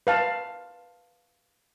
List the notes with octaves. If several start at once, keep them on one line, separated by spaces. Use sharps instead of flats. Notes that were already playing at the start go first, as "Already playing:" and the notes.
B4 F5 A5